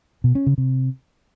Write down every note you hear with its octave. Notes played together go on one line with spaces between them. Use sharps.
B2
C#4
C#3
C3